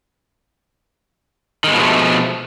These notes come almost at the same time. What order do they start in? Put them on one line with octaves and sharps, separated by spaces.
D#3 G#3 B2 F3 A3